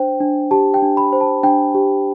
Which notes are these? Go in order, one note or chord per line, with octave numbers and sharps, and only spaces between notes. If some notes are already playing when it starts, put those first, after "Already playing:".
Already playing: D4 C5 G5
D4
G4 A5
G5
D4
B5
C5
A5
D4 G5
G4